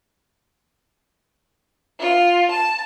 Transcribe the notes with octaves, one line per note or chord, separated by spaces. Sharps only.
F4
A5